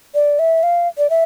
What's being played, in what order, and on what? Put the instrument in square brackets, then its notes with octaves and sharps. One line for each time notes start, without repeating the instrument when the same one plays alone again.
[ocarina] D5
E5
F5
D5
E5